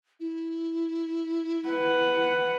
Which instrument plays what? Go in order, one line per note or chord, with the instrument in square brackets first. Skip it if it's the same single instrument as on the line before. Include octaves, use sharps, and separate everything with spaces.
[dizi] E4
[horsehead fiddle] B4 F#5